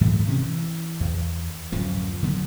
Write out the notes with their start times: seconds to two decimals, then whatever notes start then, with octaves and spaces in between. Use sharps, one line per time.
0.01 G#2 E3 F#3 A3
0.27 C3 D#3 C#4
0.43 E3
1.00 E2
1.72 D1 F#2 F3
2.22 D3 F#3 B3